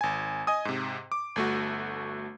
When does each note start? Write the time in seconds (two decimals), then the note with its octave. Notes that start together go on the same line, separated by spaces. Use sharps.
0.01 G#1 G#5
0.47 D#5 G#5 D#6
0.65 G#2 C3
1.12 D6
1.36 G1 A3 F#4